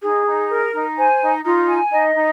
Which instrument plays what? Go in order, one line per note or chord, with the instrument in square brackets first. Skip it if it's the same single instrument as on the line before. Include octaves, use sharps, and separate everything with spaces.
[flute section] D#4 [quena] G#4
[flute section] D#4
A#4
D#4
[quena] C5 [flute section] G#5
[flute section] D#4
[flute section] D#4 [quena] F4
[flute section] G#5
[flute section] D#4 [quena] D#5
[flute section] D#4